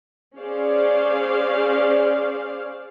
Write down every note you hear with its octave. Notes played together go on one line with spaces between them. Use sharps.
C#4 G#4 C5 D5 F5